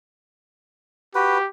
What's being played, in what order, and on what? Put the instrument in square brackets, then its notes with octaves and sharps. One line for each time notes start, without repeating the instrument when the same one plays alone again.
[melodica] F#4 B4 [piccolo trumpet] G4